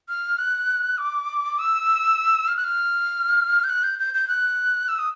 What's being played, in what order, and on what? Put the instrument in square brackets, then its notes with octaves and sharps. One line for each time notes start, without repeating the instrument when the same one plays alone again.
[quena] F6
F#6
D6
E6
F6
F#6
F6
G6
F#6
G6
G6
G6
F#6
E6
D#6